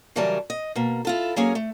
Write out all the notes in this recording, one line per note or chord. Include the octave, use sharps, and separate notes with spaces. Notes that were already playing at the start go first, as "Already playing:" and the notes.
C#3 E3 F#3 G3 A#4 A5
D#5
B2 A#3
E4 F4 A4
F#3 A#3 C#4 G#4 A#4 C#5
A3